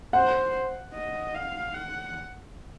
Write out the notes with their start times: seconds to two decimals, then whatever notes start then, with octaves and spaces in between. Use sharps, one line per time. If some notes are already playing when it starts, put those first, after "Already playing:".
0.13 C5 F#5
0.94 D#5
1.34 F5
1.74 F#5